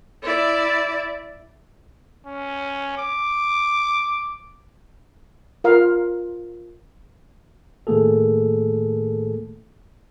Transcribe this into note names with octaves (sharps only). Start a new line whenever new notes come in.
E4 D5
C#4
D6
F4 A#4 F5
A2 D#3 A3 A#3 G#4 A4